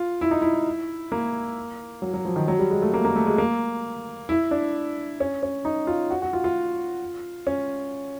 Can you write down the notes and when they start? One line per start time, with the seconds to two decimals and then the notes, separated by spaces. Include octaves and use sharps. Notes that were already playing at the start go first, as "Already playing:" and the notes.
Already playing: F4
0.21 E4
0.31 D#4
0.42 E4
1.12 A#3
2.02 F#3
2.14 F#3
2.25 F3
2.36 D#3
2.48 F#3
2.59 G3
2.71 G#3
2.82 A3
2.94 A#3
3.05 A#3
3.16 A3
3.27 G#3
3.38 A#3
4.29 E4
4.51 D4
5.20 C#4
5.43 C#4
5.65 D#4
5.87 F4
6.10 F#4
6.22 F#4
6.33 F4
6.44 F4
7.47 C#4